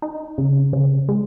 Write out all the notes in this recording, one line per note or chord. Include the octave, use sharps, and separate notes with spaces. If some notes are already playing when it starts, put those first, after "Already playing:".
D#4
C#3
C#3
G#3